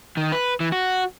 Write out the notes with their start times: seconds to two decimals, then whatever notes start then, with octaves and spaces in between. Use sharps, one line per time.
0.17 D#3
0.32 B4
0.60 E3
0.72 F#4